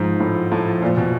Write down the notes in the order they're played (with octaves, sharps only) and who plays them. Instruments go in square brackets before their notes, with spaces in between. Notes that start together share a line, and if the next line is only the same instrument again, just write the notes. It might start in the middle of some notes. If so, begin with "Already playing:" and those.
Already playing: [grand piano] G#2 [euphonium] F3
[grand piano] A2
A2
A#2
B2